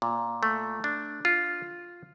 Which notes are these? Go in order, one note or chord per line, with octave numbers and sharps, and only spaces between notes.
A#2
A3
D4
F4